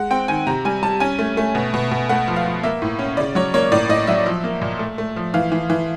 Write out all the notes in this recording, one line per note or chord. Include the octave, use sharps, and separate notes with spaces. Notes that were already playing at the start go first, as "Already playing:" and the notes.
Already playing: G#3 F#5
C4 G5
D#3 G#5
C3 A#5
G3 G#5
G3 A5
C#4 G#5
A3
A3
B2
B2
B2
A3 F#5
F3
F5
F3
A#3 E5
A2
C#4
C#3 D5
F#3 C#5
A#3 C#5
A2 D5
A2 D#5
F#3 E5
F3
A#3
A#2
A3
A3
F3
E3 F5
E3
E3